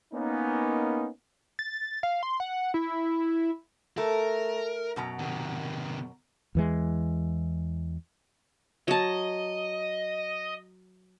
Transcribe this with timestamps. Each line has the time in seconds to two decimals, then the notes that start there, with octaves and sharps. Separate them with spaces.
0.14 A#3 B3 C#4 D#4
1.59 A6
2.03 F5
2.23 C6
2.40 F#5
2.74 E4
3.98 A3 A#4
4.96 F#2 B2 A#5
5.19 C3 D#3
6.55 E2 E3 G#3
8.88 F#3 D#5 A5